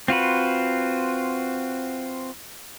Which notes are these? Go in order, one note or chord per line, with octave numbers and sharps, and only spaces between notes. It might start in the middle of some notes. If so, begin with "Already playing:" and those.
C4 F4 F#4 B4